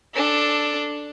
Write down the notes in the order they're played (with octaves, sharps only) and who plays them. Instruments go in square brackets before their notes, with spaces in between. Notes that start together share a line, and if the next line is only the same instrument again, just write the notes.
[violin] D4 A4